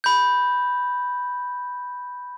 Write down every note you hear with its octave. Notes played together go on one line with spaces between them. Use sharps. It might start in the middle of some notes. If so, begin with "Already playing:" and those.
B5 G6